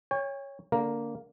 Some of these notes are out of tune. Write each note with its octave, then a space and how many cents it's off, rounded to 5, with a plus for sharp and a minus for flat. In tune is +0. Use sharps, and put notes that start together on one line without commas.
C#5 +0 G5 +45
D3 -15 A#3 +0 A#4 +0